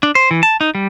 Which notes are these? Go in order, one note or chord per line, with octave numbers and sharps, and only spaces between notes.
D4
C5
E3
A5
D#4
G3